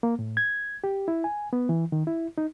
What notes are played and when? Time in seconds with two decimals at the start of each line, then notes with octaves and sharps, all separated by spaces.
0.03 A#3
0.19 A2
0.37 G#6
0.84 G4
1.08 E4
1.24 G#5
1.53 B3
1.69 E3
1.92 D#3
2.07 E4
2.38 D#4